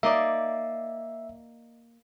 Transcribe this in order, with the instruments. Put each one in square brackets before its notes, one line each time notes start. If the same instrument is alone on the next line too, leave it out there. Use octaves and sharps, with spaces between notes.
[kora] A#3 D#4 D5 [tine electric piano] E5